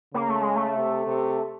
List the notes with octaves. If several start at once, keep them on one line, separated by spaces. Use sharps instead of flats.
C#3 A#3
A3
G#3
A3
C3
C3